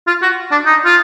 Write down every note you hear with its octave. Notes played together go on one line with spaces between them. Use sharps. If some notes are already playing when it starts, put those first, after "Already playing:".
F4
F#4
D4
D#4
F4